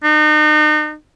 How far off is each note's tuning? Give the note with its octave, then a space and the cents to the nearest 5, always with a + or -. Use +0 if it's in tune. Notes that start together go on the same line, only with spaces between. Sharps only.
D#4 -40